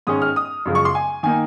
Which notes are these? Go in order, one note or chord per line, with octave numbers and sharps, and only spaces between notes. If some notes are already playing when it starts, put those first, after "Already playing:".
G#2 D#3 G#3 C#4 D#6
F6
D#6
F#2 C#3 F3 G#3
C#6
C6
G#5
D#3 A#3 D#4 G#5